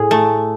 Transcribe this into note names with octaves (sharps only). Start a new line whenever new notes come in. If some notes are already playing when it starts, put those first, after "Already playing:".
Already playing: A2 G#4
A3